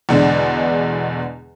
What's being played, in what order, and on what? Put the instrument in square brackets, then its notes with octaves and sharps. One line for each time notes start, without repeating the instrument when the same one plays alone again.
[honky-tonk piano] E2 B2 D3 G#3 D4